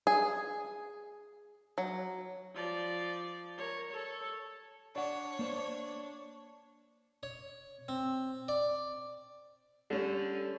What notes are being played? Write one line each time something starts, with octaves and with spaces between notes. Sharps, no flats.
G#4
F#3
F3 D5
A#4 C#5
A4 C#5
D4 C#5 D5 F#5
A#3 D4 C5
C#5
C4
D5
D3 G3 C#4